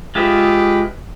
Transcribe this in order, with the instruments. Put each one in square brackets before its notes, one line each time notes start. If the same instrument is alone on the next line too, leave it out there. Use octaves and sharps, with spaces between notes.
[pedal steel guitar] G#3 F4 E5 [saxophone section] G4 G#4 B4